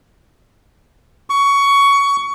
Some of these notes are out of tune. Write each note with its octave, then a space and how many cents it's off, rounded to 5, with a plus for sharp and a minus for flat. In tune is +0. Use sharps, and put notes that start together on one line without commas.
C#6 +15